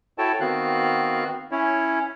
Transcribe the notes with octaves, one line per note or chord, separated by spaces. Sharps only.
E4 F#4 A4 C#5 G5 A5
D#3 B3 C4 F#4 F5 F#6
C#4 E4 C#5